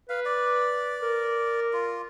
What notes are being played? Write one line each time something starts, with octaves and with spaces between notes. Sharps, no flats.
B4 F5
D5
A#4
F4